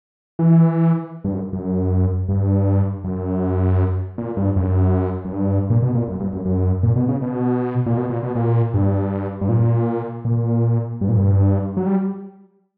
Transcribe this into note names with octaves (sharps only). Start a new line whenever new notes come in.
E3
G2
F#2
F#2
G2
F#2
A#2
G2
F#2
F#2
G2
A#2
B2
A#2
F#2
G2
F#2
F#2
A#2
B2
C#3
B2
A#2
B2
A#2
B2
A#2
G2
G2
A#2
A#2
G2
A#2
G2
F#3
G3